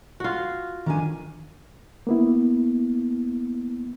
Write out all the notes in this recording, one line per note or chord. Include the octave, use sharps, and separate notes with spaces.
F4 F#4
D#3 D4 G#5
A#3 B3 E4